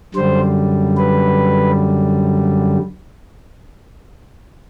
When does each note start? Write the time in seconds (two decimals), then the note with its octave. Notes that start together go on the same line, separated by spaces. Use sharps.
0.15 F#2 D3 G3 C5
0.97 B4